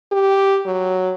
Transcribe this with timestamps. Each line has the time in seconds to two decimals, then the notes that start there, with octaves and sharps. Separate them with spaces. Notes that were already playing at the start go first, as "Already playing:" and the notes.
0.12 G4
0.66 F#3